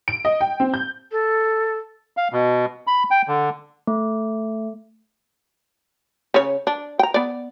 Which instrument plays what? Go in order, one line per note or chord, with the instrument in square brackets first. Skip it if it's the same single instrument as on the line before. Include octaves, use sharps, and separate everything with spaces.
[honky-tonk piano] D7
D#5
G5
C4
G6
[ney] A4
[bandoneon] F5
B2
B5
G5
D3
[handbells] A3
[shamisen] C#3 C#5
D4
G5 A#5
B3 D5